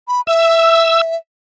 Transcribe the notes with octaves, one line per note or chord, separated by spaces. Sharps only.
B5
E5 E6